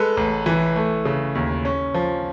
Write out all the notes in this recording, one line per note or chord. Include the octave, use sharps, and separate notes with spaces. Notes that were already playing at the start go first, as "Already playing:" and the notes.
Already playing: G#3 A4 B4
A1
E3
A3
C#3
D#2
C#4
F3